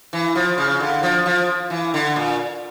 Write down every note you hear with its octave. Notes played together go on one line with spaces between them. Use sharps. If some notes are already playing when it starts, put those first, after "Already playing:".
E3
F3
C#3
D3
F3
F3
E3
D3
A#2